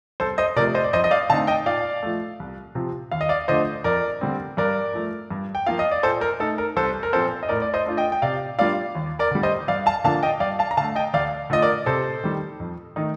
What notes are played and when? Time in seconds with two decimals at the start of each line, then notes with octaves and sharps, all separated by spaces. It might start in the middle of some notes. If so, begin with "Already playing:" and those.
0.20 C2 A4 C5
0.38 C5 D#5
0.56 C3 F3 A3 A#4 D5
0.75 C5 D#5
0.84 D5
0.93 F2 C5 D#5
1.04 D#5
1.11 D5 F5
1.30 D3 A3 C4 D#4 F5 A5
1.47 D#5 G5
1.66 A#2 D5 F5
2.03 F3 A3
2.40 C2
2.75 C3 F3 C4
3.11 D#2 F5
3.21 D#5
3.29 D5 F5
3.48 D3 F3 A3 D4 C5 D#5
3.84 F2 A#4 D5
4.21 D3 G3 C4
4.57 G2 A#4 D5
4.94 F3 A3
5.31 G2
5.55 G5
5.67 F3 A#3 F4 F5
5.79 D#5
5.91 D5
6.03 A#2 A4 C5
6.21 A#4
6.40 A3 D#4 A4
6.58 A#4
6.76 C2 A4 C5
7.03 A#4
7.13 A#2 F3 C4 A4 C5
7.43 D#5
7.49 A2 A#4 D5
7.62 D5
7.74 C5 D#5
7.86 A3 D4 F4
7.97 D#5 G5
8.12 G5
8.22 C3 D5 F5
8.59 G3 A#3 D4 F4 D5 F5
8.95 D#2
9.19 A#4 D5
9.31 D3 G3
9.43 C5 D#5
9.68 G2 D5 F5
9.86 F5 A5
10.04 D3 F3 A#3 D4 F5 A5
10.23 D#5 G5
10.40 G2 D5 F5
10.59 F5 A5
10.71 A#5
10.77 D3 F5 A5
10.81 A3
10.96 D#5 G5
11.13 D2 D5 F5
11.50 D3 A3 D4 F4 D#5
11.62 A#4 D5
11.86 C3 A4 C5
12.24 D#3 G3
12.60 F2
12.96 D#3 A3 D#4